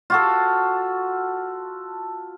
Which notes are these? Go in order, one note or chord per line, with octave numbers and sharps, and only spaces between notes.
F4 F#4 A4